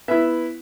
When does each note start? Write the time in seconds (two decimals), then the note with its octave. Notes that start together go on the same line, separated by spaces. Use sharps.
0.08 B3 E4 E5